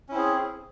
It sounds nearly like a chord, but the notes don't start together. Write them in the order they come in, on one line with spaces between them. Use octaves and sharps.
C#4 E4 C4 G#4